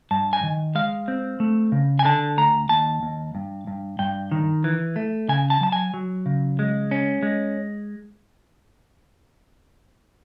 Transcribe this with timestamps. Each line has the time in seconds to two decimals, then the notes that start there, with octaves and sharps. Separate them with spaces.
0.11 G2 A5
0.33 G#5
0.43 D#3
0.75 G#3 F5
1.08 C4
1.40 A3
1.72 C#3
1.99 G#5
2.05 D3 A5
2.38 D2 A#5
2.69 D#2 A5
3.03 D#2
3.35 G2
3.67 G2
3.99 G2 G5
4.32 D#3
4.64 E3
4.96 A3
5.29 C#3 G#5
5.50 A5
5.61 F#3 A5
5.72 G#5
5.94 F#3
6.26 C#3
6.59 G#3
6.91 C#4
7.23 G#3